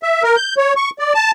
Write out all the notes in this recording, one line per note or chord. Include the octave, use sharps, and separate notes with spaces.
E5
A#4
G6
C#5
C#6
D5
A5